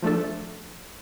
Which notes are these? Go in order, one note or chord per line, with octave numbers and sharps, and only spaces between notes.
F3 A3 D4 A4